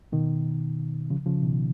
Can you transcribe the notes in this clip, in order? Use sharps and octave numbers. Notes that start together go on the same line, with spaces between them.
B2 D#3
C#3 F3
C#3 F3
B2 D#3